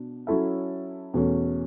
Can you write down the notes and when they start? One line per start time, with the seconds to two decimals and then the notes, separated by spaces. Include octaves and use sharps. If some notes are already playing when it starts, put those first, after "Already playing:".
Already playing: B2 D4
0.27 F#3 C#4 E4 A4 E5
1.14 E2 B2 A3 C#4